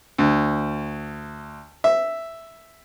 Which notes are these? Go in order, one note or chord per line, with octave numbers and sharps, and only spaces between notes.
D2
E5